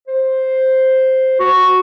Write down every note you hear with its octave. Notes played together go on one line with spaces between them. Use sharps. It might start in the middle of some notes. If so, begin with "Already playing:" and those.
C5
F#4